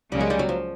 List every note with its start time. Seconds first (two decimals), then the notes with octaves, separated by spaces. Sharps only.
0.11 C#2 C#3 F#3 G3 A#3 C#4
0.21 G#3
0.30 G3
0.39 F#3
0.49 F3